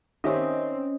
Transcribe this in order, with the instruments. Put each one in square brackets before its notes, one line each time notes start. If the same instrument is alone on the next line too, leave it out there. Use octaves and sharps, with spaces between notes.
[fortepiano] D#3 G4 E5 [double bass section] C4 [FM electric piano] C#4 D#5